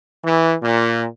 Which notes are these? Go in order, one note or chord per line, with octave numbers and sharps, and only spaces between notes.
E3
A#2